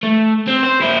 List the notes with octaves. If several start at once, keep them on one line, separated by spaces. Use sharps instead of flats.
A3
C4
C5
A#3 E4